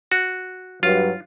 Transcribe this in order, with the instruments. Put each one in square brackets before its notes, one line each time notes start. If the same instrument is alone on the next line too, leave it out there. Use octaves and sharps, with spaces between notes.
[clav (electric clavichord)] F#4
[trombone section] G2 F#3 [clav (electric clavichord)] F4